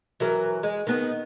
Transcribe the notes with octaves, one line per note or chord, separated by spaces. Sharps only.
E3 F#3 A#4
G#3
D#3 B3